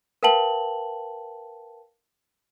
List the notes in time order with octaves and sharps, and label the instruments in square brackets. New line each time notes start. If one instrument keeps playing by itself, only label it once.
[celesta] A#4 B4 F5 G5 A5 F#7